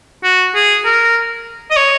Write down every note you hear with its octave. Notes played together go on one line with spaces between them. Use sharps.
F#4
G#4
A#4
D#5
C#5